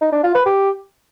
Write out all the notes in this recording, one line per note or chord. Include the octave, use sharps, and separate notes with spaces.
D#4
D4
F4
B4
G4